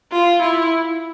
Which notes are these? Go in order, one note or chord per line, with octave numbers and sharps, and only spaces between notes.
F4
E4